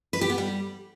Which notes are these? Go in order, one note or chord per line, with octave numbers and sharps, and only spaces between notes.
B4
G4
B3
G3